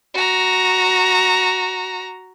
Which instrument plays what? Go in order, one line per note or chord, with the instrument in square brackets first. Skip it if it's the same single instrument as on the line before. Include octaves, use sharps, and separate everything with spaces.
[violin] F#4 A#5